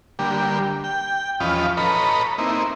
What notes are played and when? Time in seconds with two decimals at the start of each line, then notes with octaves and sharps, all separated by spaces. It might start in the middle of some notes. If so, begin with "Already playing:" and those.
0.19 D3 G3 A#3 G4
0.84 G5
1.40 E2 F3 C#4 F4 D#5 B5
1.77 A4 B4 C#5 D#5 A#5 B5
2.38 A#3 C4 D#4 E4